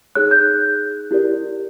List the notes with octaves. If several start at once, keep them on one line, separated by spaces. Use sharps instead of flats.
D#4 G#4 C#5 F#6
G6
E4 G4 A#4 D5